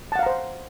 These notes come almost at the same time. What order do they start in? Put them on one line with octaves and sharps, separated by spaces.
A5 F#5 F5 A#5 C5